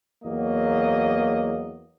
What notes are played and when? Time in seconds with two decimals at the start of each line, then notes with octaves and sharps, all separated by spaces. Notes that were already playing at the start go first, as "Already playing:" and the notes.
0.24 E2 F#3 A#3 D#5